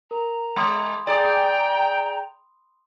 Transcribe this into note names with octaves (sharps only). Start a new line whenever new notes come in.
A#4 A#5
G#3 B5 C6 D#6
G#4 D5 G5 A#5